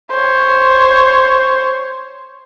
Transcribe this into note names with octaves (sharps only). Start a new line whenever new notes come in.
C5 C#5